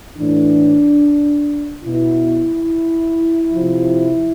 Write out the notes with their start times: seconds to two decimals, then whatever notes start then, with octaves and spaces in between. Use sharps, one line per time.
0.17 A2 E3 D4
1.85 B2 E4
3.52 C3 F3